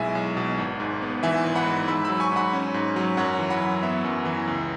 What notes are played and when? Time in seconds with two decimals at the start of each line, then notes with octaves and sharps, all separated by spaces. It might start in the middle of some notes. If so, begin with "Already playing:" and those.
Already playing: B1 B2 G#3 E4 E5 G#5
0.15 B1
0.37 B2
0.58 G#1
0.80 G#2
1.02 B3
1.23 E3 E5 G#5
1.45 G#1
1.55 F#5 B5
1.66 G#2
1.88 G#2 B5 E6
2.04 F#3 B5 E6
2.20 G#5 C#6
2.32 G#2 F#5 B5
2.53 C#4
2.74 G#2
2.96 F#3
3.17 F#2 C#5 F#5
3.39 E3
3.50 F#5 B5
3.61 F#2
3.83 B3 E5
4.04 F#2
4.25 E3
4.47 C#2